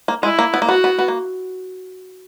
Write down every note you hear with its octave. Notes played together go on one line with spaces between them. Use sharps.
A#3
G#3 E4
A#3
B3
A#3
B3 F#4
B3
B3
A#3